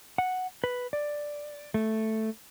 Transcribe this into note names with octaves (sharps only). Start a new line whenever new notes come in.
F#5
B4
D5
A3